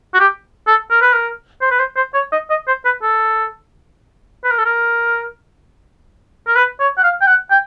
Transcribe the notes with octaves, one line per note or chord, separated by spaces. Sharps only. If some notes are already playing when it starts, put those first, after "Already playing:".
F#4
G4
A4
A#4
B4
A#4
C5
B4
C5
C5
C#5
D#5
D#5
C5
B4
A4
B4
A#4
A4
A#4
A#4
B4
C#5
F#5
F5
G5
F#5
G5